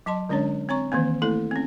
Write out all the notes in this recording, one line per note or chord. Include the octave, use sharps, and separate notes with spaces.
F#3 D#5 A5 C6
D3 G#3 C#4 D4 C#5
C4 C#5 A#5 C#6
D#3 E3 A#3 C4
A3 A#3 E4 A4
C4 C#4